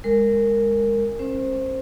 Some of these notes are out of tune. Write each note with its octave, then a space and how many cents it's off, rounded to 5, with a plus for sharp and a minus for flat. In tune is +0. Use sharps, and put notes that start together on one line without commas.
G#3 -15 A#4 -10
C#4 -45 C5 +0